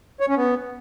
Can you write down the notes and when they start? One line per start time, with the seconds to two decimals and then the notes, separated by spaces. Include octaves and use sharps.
0.20 C#5
0.28 C#4
0.37 B3